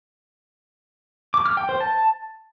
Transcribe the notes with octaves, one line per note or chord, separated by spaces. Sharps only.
D6
F6
G5
C5
A5